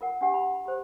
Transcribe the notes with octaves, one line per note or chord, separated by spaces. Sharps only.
F4 A#4 F#5
D4 F#4 G4 F#5
B5
G4 C5